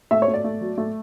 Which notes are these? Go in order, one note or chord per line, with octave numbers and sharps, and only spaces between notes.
A3 E5
C#5
A3
D5
A3
F#3
A3